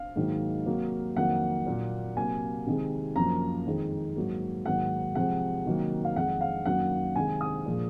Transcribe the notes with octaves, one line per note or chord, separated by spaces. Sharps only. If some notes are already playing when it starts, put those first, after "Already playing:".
Already playing: F5
G#2 D#3 F#3 A#3
C3 F#3 A#3
F2 D#3 F#3 A#3 F#5
A#2 F#3 A#3
C3 F#3 A#3 G#5
C3 D#3 G#3
F#2 F3 A#3 A#5
F2 D#3 G#3
G#2 F#3 A#3
G#2 D#3 F#3 A#3 F#5
C3 F3 G#3 F#5
C3 D#3 F#3 A#3
F5
F2 D#3 G#3 F#5
F5
F#2 D#3 F#3 A#3 F#5
C3 D#3 G#3 G#5
D#6
A#2 F3 G#3